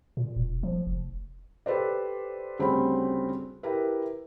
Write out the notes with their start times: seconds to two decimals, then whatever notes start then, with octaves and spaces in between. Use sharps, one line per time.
0.17 A#2
0.36 E1
0.63 F3
0.87 F1
1.66 G4 A4 B4 C5 D5
2.59 D2 C#3 G3 C4 B5
3.63 E4 G4 A#4 B4